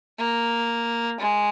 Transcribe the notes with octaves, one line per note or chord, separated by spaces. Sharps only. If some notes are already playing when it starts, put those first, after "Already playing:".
A#3
G#3